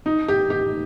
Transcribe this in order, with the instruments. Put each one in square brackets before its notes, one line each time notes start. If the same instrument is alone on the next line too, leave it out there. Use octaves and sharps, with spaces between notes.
[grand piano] D#4
G4
G4